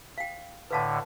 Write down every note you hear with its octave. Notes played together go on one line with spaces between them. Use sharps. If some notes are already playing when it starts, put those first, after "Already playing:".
F5 G5
A2 D3 B4 F5 A5